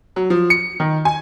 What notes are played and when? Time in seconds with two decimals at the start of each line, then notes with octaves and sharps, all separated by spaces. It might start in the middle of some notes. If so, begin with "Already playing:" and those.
0.16 F#3
0.30 F3
0.50 C#7
0.80 D#3
1.05 G#5